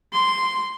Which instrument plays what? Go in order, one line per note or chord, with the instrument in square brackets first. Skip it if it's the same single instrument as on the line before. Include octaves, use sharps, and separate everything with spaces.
[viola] C6